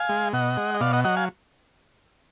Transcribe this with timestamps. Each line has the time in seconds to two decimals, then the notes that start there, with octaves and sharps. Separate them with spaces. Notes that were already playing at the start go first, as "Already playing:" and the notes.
Already playing: F5 G#5
0.09 G#3
0.33 B2 D#5 F#5
0.57 G#3
0.74 D#5
0.81 B2 D5 F5
0.93 D#5 F#5
1.04 F#3 D#5 F#5
1.17 F5 G#5